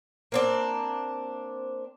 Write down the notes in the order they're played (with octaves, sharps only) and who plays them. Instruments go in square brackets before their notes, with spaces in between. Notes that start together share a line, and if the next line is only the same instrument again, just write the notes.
[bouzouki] A#3 C4 D4